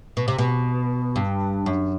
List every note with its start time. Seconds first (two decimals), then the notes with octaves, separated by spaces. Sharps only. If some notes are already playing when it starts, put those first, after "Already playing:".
0.17 B2
0.28 C3
0.38 B2
1.16 G2
1.66 F#2